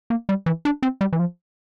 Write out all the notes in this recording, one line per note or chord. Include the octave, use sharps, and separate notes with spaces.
A#3
G3
E3
D4
C4
G3
E3
F3